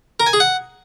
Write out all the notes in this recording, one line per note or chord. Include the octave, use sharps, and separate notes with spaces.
A#4
G#5
G#4
F#5